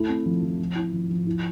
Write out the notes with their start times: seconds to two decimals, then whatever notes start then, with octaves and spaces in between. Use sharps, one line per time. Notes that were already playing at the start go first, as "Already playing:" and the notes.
Already playing: A3 E4
0.09 C4
0.26 F3
0.42 F3
0.59 F3
0.75 E4
0.93 F3
1.10 F3
1.26 E4